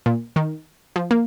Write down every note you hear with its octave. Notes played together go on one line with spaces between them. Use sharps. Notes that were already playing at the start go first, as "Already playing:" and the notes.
A#2
D#3
F3
A#3